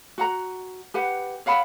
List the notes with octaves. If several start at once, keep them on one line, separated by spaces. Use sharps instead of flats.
F#4 F#5 A#5
G4 B4 F#5
C#5 F5 F#5 B5